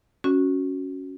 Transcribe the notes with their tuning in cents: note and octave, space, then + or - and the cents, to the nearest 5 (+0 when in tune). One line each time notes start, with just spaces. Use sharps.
C#4 +0 F#4 +0